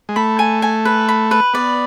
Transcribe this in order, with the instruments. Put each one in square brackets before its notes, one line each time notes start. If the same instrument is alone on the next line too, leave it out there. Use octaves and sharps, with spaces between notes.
[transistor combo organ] G#3
[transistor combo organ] A3 [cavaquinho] B5
[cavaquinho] G#5
G#5
B4
B5
B4
[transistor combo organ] B3 [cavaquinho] D5